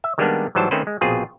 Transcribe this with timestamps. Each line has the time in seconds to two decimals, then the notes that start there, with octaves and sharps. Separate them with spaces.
0.04 E5
0.18 D#3 G3 G#3 A#3 B3 D4
0.55 G#2 E3 F#3 G3 C5 A5
0.71 D#3 A3 C4 C#4 B4 C5
0.87 G#3
1.01 A#1 B2 C4 F4 G#4